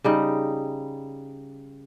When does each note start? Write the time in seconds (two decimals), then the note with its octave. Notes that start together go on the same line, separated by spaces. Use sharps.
0.04 C#3 G3 D#4